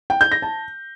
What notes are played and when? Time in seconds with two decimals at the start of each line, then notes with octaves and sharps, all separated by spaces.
0.10 G5
0.21 G6
0.32 A#6
0.42 A5